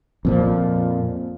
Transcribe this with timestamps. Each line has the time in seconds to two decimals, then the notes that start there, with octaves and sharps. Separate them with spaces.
0.25 F2 A#2 F3